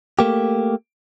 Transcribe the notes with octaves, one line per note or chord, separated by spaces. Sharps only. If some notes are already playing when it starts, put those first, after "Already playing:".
A3 A#3 G4